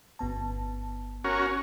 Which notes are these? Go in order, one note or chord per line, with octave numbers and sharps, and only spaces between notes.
G1 B3 A5
C#4 F#4 A#4